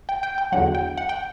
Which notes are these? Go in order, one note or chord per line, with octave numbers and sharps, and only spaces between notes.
G5
G5
G5
E2 D3 F#3 F#5
G5
F#5
G5